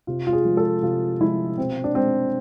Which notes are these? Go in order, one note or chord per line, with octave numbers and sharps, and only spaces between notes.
C3 F4
F4
G#4
F3 G#3
A4
C3 F4
F3 G#3 E4
B2 C4
D4
G#3 C4